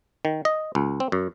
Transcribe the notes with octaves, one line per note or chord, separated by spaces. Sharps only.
D#3
D#5
C#2
C4
F#2